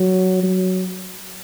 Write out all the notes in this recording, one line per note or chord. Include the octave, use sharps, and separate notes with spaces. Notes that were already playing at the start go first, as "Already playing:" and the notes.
Already playing: F#3
F#3